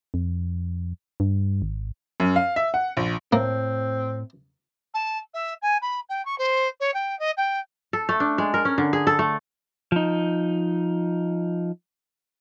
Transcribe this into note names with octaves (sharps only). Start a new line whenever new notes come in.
F2
G2
G#1
F#2
F5
E5
F#5
A#1
A2 A#3 C4
A5
E5
G#5
B5
G5
C#6
C5
C#5
G5
D#5
G5
A4
A3
D4
G#3
A#4
C#4
D3
G#4
A4
A3
F3 D#4